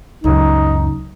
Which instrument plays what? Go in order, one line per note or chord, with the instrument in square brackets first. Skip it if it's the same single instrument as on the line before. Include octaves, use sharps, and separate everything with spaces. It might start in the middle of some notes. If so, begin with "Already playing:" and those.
[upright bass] C#2 F#2 [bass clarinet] D#4